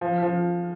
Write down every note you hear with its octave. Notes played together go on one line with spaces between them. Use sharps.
F3
F3